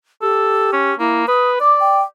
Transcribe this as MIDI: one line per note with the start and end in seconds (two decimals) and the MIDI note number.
0.22 0.95 67
0.22 0.72 69
0.73 0.93 61
0.99 1.23 58
0.99 1.24 64
1.28 1.56 71
1.28 1.50 87
1.60 2.02 74
1.60 1.77 86
1.80 2.02 79